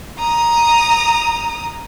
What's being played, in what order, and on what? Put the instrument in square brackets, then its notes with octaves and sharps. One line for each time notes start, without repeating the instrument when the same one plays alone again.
[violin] A#5 D#6